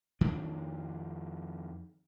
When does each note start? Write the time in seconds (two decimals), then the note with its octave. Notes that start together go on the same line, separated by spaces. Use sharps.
0.21 F2 D#3 F3 D4